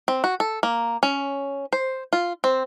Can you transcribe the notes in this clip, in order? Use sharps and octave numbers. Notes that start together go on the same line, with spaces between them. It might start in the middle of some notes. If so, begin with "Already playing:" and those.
C4
F#4
A4
A#3
C#4
C5
F4
C4